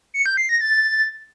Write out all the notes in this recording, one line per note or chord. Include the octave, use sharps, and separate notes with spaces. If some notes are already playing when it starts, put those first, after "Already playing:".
C#7
G6
C7
A#6
A6